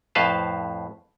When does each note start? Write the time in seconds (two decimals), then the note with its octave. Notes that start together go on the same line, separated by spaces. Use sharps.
0.15 F2 A2 B4 C5 F5 A5